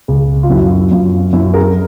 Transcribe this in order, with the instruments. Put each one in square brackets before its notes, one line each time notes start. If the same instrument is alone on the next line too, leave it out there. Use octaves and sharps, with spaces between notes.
[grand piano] C#2
F4
F#2 E4 F#4
F#2 F4
F#2 E4
G#4 A#4